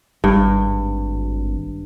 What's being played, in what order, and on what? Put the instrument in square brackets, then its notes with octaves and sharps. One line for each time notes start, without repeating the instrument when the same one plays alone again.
[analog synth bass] G#1 [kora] G2